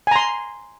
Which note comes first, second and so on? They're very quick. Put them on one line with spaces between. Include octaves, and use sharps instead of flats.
G#5 A#5 C6